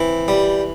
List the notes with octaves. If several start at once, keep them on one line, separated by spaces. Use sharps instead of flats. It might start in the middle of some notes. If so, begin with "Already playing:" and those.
Already playing: E3 C4
G3